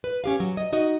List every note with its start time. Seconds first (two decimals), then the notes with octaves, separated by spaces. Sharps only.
0.04 B4
0.24 C#4 G4 F5
0.40 F#3
0.57 D#5
0.73 D#4 F#4 D#5